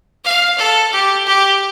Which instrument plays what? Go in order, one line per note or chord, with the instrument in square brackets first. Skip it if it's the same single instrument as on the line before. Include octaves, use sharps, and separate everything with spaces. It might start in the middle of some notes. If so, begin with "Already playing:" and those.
[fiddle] F5
A4
G4
G4